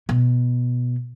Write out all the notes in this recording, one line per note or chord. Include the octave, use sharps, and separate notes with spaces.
B2